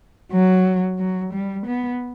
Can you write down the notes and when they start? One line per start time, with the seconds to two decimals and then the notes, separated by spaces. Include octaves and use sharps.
0.32 F#3
0.99 F#3
1.33 G3
1.66 B3